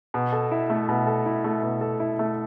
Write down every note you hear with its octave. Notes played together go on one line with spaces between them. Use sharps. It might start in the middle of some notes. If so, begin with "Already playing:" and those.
B2
A4
E4
A3
B2
A4
E4
A3
B2
A4
E4
A3